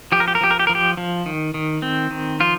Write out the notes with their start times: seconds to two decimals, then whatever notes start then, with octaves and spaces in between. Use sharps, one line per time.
0.12 F3 G4
0.20 A#4
0.28 G4
0.35 A#4
0.41 F3 G4
0.51 A#4
0.59 G4
0.67 F3 A#4
0.75 G4
0.97 F3
1.26 D#3
1.54 D#3
1.82 C4
2.11 D#3
2.40 F3 F4